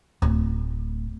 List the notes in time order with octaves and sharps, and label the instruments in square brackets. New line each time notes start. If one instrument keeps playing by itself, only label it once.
[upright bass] D1